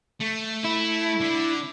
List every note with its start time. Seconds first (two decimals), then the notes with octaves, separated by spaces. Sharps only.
0.20 A3
0.64 E4
1.21 D3